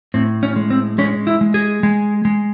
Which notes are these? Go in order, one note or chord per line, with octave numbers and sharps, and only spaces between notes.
A2 C4
C#4
G#3
C4
G#3 C#4
E4
G#3
G#4
G#3
G#3